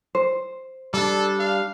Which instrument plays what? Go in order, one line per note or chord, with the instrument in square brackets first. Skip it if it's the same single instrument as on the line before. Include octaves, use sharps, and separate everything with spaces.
[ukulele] C5
[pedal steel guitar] G3 D4 [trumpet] A4
[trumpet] F5